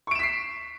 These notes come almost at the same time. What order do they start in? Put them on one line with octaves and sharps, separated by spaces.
C#6 D7 E7 B6 C7